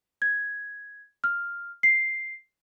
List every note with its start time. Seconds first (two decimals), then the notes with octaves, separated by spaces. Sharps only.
0.22 G#6
1.24 F6
1.83 C7